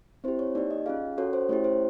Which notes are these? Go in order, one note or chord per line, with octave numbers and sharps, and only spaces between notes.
C4 E4 G4 C5
C#5
A#3 D#4 G4 D5
D#5
C#4 F4 G#4 F5
C#4 F#4 A4 C#5
C5
A3 C#4 E4 G4 C#5
C5